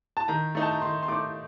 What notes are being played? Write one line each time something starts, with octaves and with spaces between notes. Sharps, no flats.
A5
D#3 A#5
A3 D#4
A5
A#5
D#3 C6
C6
A3 D#4 D6